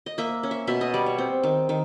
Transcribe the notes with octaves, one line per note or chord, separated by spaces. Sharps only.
D#5
A#3 E5
C#4
E5
B2 E5
D#5
G3 D5
C#5
C4
D#3
D#3